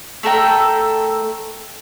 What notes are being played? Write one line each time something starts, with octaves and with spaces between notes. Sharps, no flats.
A3 A4 A#4 G5